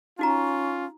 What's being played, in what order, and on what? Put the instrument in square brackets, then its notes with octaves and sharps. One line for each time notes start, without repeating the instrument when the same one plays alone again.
[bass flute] C#4 [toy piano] D#4 F#4 A#5 [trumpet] F4